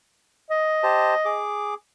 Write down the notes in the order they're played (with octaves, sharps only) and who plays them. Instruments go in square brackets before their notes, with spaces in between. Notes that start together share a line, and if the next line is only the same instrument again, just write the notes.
[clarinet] D#5
[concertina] G4 C5 A5
G#4 D6